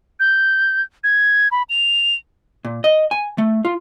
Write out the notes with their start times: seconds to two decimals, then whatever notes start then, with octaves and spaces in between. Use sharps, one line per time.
0.20 G6
1.04 G#6
1.51 B5
1.69 F7
2.65 A#2
2.84 D#5
3.11 G#5
3.38 A3
3.65 F4